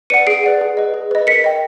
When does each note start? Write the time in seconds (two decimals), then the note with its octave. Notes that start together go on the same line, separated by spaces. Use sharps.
0.10 B4 D5 F#5 C#7 D#7
0.27 G#4 C7 D7
0.43 B4 D5 F#5
0.61 G#4
0.77 B4 D#5
0.94 G#4
1.11 B4 D#5
1.27 A#4 B6 C#7
1.44 D#5 G5